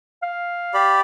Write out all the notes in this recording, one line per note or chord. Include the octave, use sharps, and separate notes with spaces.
F5
G4 D5 B5